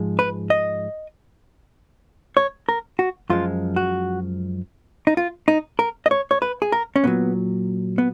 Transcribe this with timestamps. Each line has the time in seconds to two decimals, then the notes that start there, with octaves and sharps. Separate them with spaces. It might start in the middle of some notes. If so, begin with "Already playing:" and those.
Already playing: G#2 F3 G#3
0.19 B4
0.50 D#5
2.37 C#5
2.69 A#4
2.99 F#4
3.30 F#2 F3 G#3 F4
3.76 F#4
5.07 D#4
5.17 F4
5.48 D#4
5.79 A#4
6.06 D#5
6.11 C#5
6.31 C#5
6.42 B4
6.62 G#4
6.72 A#4
6.96 C#4
7.04 A#2 F#3 B3
7.98 B3